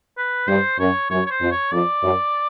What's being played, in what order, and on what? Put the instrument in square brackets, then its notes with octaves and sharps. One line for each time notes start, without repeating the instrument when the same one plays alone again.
[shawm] B4
[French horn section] G2 [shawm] C5
[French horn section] F#2 [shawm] C#5
[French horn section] F#2 [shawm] C#5
[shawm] C#5
C5
[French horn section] F2
[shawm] C#5
[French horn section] F2 [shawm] D5
[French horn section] F#2